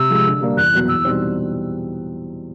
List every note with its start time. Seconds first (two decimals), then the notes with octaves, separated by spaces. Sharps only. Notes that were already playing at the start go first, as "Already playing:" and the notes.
Already playing: C3 E6
0.10 F3 G#3
0.26 D3
0.41 G3 A#3 D4
0.57 E2 F#6
0.73 B2 F#3 B3
0.89 E2 E6
1.05 B2 G3 C4 D#4